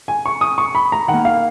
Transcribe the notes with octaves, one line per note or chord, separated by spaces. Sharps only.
G#5
C#6
D#6
C#6
B5
A#5
D#3 F#5
A#3
F5